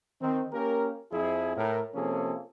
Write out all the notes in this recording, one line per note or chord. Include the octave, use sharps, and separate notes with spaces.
D#3 C4
A#3 C#4 G4 A#4
F2 F3 E4 G#4
A2 A#4
C3 F3 A#3 C#4 G#4 A4